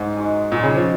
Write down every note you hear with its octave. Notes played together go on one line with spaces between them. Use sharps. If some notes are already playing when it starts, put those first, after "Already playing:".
Already playing: G#2 C#4 G#4 D#5
G#3 D#4 F#4
A#2 G#3 D#4 F#4
C#3
F3